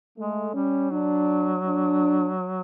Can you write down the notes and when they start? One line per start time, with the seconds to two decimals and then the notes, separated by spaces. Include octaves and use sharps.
0.17 G#3 A3
0.54 G3 C#4
0.91 F#3 D4
1.65 D4